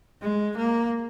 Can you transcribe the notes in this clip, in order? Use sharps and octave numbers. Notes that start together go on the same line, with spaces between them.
G#3
A#3